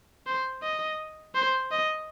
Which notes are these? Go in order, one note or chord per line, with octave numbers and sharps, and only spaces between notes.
C5
D#5
C5
D#5